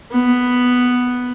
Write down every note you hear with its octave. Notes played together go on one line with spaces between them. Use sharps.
B3